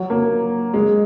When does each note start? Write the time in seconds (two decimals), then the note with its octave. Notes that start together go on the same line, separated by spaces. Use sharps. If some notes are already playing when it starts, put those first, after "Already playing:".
Already playing: F#3
0.10 A#3
0.74 G#3